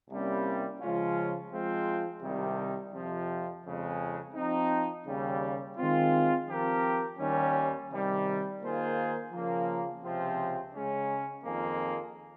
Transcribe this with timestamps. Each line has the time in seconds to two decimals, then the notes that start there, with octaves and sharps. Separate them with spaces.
0.09 C2 C3 G3 A#3 C#4
0.80 C#3 F3 G#3 C#4 F4
1.52 F3 G#3 C4 F4
2.22 C2 C3 D#3 G3
2.93 F2 C3 F3
3.64 F2 C#3 G#3
4.35 F3 C4 D#4
5.06 D#2 C#3 G3
5.78 D#3 G#3 C4 F4
6.49 F3 C4 G4 A#4
7.19 D#2 D#3 G3 C#4
7.91 C3 D#3 G3
8.61 D#3 A#3 F4 G#4 C5
9.31 C#3 F3 A#3
10.03 C#2 C3 F3 C4 F4
10.73 C#3 G#3 C#4
11.44 F2 D#3 A#3 F4 G#4